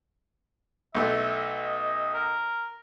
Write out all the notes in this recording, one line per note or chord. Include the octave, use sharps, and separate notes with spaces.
B1 A3 E5
D#5
A#4